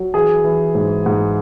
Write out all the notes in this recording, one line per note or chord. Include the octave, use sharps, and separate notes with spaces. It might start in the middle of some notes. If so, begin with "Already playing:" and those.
Already playing: F#3
E3 G#4
E3
G#2
G#2